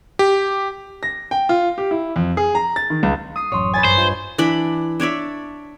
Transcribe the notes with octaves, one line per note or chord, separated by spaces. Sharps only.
G4
A#6
G5
F4
G4
E4
F2
G#4
A#5
A6
D#3
C#2
D#6 C7
A1 F#2 C#5 C6
B4 C#5 G#5 A6
G2 C5
F4 D#5
E3 D4 D5 B5
D4 C#5 D5 E5